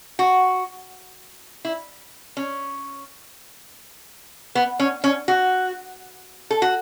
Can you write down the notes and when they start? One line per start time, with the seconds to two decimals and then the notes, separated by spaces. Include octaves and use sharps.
0.19 F#4
1.65 E4
2.37 C#4
4.55 B3
4.80 C#4
5.04 C#4
5.28 F#4
6.51 A4
6.62 F#4